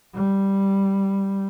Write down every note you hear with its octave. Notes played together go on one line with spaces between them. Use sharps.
G3